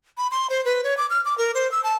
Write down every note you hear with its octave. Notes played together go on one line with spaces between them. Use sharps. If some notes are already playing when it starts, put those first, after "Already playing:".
B5
C6
C5
B4
C#5
D6
F6
D6
A#4
C5
E6
A5